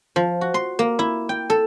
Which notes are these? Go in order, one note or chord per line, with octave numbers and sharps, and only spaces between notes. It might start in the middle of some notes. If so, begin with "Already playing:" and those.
F3
F#4
C6
A#3
E4
G5
A4